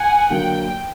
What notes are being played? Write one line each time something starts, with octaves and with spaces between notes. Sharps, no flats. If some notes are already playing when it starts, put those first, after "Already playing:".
Already playing: F#5 G#5
D3 F#3 A#3 G5